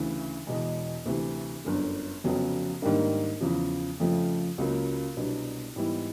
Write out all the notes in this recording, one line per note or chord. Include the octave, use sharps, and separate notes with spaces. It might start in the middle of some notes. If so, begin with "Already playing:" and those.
Already playing: D2 C#3 E3
E1 E2 B2 G#3
D2 C3 E3
G1 F#2 D3
F1 F2 C#3 F#3 B3
G#2 D#3 G3 A#3 D4
E2 C#3 F3
F2 C#3 F3 A3
C#2 C#3 F#3 A#3
C2 B2 F#3 B3 D4
G#2 E3 G3 B3 E4